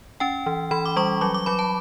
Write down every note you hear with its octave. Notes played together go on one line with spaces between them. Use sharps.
C#4 G5
E3
E3 B5
D6
G3 C#6
F#3 D6
D6
F#3 B5
A5